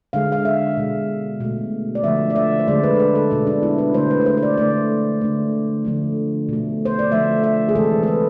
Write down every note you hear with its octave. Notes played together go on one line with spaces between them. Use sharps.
D3 G#3 F5
F5
E5
B2 G#3
B2 A3
D5
D3 F3 A3 E5
D5
E5
C5
D3 G#3 D5
B4
A4
B4
A4
B2 G#3 D4
D4
E4
B4
D3 A3 C5
B4
B4
C5
C5
D5
D3 A3 D5
D3 A3
D3 F3 A3
B2 A3
C5
D5
D3 F3 A3 E5
E5
G#4
C3 E3 G#3 A4
A4
B4